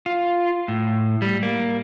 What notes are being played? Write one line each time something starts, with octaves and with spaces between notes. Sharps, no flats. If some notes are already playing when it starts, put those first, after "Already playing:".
F4
A2
G3
A#3